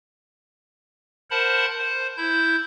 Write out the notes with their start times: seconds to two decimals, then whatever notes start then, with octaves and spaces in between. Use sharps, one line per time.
1.30 A#4 C5 F#5 A5 B5
1.78 C5
2.17 E4 G6